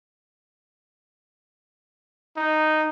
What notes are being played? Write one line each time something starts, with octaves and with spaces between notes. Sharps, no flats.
D#4